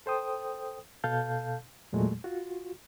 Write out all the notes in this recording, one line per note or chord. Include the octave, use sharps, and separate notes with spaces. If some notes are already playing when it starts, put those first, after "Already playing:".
A4 C5 G5 D#6
B2 A4 F5 A5 G6
E2 A#2 F#3 G#3 A3
F4 F#4